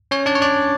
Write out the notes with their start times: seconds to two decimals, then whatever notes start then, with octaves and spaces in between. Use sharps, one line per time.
0.11 C#4 C#5
0.26 D4 D5
0.35 C#5
0.41 D4 D5